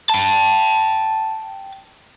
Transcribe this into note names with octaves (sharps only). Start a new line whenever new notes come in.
G5 A5